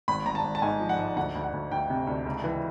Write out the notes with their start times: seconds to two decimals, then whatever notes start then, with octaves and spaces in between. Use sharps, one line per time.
0.08 G#1 B5
0.26 G#1 A#5
0.35 A5
0.44 G#1
0.55 A5
0.62 G#2 G#5
0.80 F3
0.89 F#5
0.99 G#2
1.16 D2 F#5
1.35 D2
1.44 F#5
1.53 D2
1.71 D2 G5
1.90 C3
2.07 D2
2.26 C#2
2.44 E3